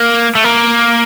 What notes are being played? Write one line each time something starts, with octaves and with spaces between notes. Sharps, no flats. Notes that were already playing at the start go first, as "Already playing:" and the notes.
Already playing: A#3
A3
A#3